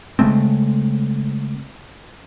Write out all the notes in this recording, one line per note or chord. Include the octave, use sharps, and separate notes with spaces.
C#3 G#3 A3 C4